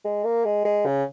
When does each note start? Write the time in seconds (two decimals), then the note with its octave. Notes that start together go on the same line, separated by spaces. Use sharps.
0.05 G#3
0.24 A#3
0.45 G#3
0.65 G#3
0.86 C#3